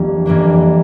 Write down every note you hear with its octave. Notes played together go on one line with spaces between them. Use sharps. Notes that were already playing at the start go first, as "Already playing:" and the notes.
Already playing: F2 E3 G3 A#3 D4
F2 E3 G3 A#3 D4